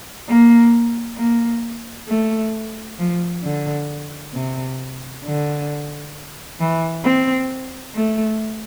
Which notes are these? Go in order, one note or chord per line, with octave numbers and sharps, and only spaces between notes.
A#3
A#3
A3
F3
D3
C3
D3
E3
C4
A3